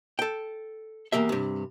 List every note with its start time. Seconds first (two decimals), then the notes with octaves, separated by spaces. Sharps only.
0.19 A4 G5
1.12 E2 A#3 G4 E5
1.29 G2 C3